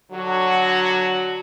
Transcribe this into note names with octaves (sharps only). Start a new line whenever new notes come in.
D3 F#3 F#4